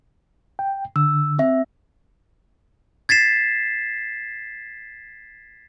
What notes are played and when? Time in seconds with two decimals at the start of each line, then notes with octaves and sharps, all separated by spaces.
0.59 G5
0.96 D3 E6
1.39 C4 E5
3.09 G#6 A6 B6 C7 E7